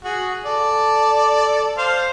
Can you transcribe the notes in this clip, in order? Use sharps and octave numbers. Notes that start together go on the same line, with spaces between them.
F#4 G#4
A4 D5
C5 F5